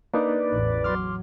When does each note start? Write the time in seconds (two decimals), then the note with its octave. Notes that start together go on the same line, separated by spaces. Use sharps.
0.14 A#3 D4 D#4 B4 D5
0.53 A1 E2 A2
0.84 F#3 C6 D6 F6